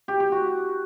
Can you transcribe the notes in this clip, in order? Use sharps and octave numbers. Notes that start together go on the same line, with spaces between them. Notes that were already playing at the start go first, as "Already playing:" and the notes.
G4
G4
F#4